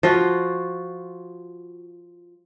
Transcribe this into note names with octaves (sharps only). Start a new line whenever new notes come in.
F3 F4 F#4